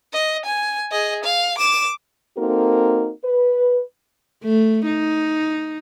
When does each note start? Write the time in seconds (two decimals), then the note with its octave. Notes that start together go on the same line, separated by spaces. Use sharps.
0.13 D#5
0.45 G#5
0.91 G#4 D#5
1.24 F5
1.58 D6 E7
2.38 A#3 C4 D#4 F#4 A4 A#4
3.25 B4
4.44 A3
4.86 D#4